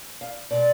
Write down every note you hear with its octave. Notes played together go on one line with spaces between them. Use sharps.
F5
B2 G#3 D5